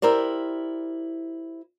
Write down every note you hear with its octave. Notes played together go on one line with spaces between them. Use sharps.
E4 G4 A#4 C5 D5